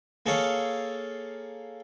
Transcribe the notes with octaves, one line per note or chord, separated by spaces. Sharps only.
A#3 G#4 A4 C#5 F5